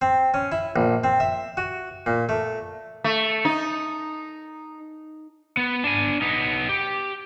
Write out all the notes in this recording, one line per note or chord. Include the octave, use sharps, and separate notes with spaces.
C4
C#4
E4
A#1
C4
E5
F#4
A#2
A3
A3
D#4
B3
D4 G#5
B3 D#4
G4